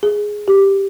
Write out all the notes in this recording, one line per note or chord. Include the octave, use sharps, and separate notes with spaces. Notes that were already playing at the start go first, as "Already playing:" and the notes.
G#4
G4